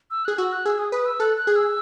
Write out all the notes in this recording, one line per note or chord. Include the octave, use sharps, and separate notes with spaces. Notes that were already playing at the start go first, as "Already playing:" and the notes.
E6
G#4 F#6
F#4 E6
F#6
G#4 E6
D#6
B4 D#6
E6
A4 F#6
F#6
G#4
E6